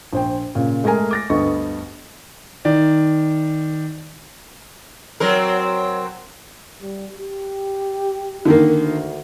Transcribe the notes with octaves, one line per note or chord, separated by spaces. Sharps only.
A#1 C5 G5
A#2 C#3
G#3 A3 G#4 A#4 G#5
D6 A6 A#6
D2 G2 B3 A4 D#5 C#6
D#3 D5
F#3 C4 A#4
G3
G4
D3 D#3 A#3
D2